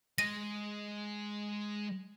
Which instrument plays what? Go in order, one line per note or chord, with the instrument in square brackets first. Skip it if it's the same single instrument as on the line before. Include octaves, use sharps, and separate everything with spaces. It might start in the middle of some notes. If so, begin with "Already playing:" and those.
[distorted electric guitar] G#3 D#5 [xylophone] A#6 D#7